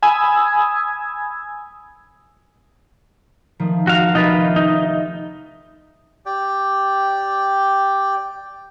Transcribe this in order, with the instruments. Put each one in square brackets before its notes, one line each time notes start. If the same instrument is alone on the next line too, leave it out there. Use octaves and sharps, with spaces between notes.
[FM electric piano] G#5 B5 D#6 E6 G#6
[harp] D#3 F3 A3
[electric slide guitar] F#4 F5
[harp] F1 E5 [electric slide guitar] D#4 F4 B4
[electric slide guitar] D#4
[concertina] G4 D5 G5